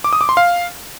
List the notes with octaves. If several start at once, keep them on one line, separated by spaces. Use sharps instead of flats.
D6
D#6
D6
C6
F5